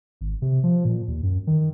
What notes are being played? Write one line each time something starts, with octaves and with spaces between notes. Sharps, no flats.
G#1
C3
F3
A#2
D#2
F#2
D#3